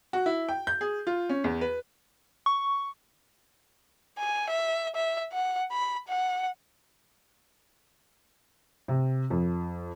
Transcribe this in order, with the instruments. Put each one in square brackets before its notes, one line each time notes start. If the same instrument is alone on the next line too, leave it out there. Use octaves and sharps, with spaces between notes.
[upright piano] F#4
E4
G5
G6
G#4
F4
C#4
E2
B4
[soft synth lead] C#6
[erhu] G#5
E5
E5
F#5
B5
F#5
[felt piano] C3
F2